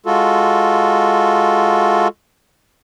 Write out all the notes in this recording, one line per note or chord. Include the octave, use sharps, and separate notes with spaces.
G#3 F4 F#4 A4